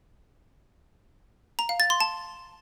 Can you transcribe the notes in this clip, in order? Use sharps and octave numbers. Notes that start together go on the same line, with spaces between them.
A#5
F5
A6
C6
A5